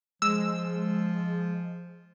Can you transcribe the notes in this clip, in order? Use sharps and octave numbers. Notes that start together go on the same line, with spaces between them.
F3 G#3 E6